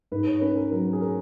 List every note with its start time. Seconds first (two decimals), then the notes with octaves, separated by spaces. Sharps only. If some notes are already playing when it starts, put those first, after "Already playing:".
0.12 G#2 B4
0.27 C#5
0.41 C#4 B4
0.57 A#4
0.71 F#3 A#4
0.93 G#4
1.01 A#4